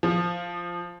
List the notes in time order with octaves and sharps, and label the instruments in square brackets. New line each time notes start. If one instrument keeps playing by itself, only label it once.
[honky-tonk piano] F3